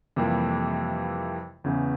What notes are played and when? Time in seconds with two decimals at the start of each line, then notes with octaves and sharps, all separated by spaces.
0.16 F2 C3 E3 G3 A#3
1.64 E2 C#3 E3